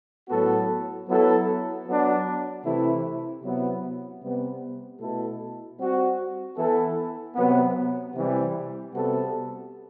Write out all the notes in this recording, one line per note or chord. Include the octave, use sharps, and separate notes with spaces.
A2 F#3 B3 F#4 A4
F#3 B3 E4 A4
F#3 B3 D4
C3 E3 A3 E4
C3 F#3 B3 E4
C3 G3 B3
B2 A3 E4 A4
G3 C4 F#4
E3 B3 E4 A4
C3 F#3 B3
C3 E3 G3
C3 G3 B3 F#4 A4